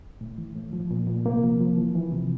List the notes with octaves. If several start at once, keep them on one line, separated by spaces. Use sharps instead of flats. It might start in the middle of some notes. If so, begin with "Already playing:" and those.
A2
E3
A2
F3
A#2
A#2
C3 A#3
F3
F3
E3
E3
C3